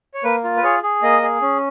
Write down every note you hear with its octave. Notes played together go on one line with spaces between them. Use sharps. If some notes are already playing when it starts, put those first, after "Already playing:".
C#5
A#3 B4
F4
B4
G#4 C#5
G#4
A#3 D#5
G#4
C#4